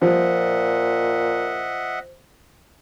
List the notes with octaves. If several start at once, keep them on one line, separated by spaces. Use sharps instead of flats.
A#2 F3 C5 D#5 E5 F#5